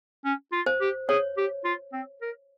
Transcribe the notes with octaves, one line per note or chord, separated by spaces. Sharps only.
C#4
F4
C5
G4
G#4 C#5
G4
F4
C4
A#4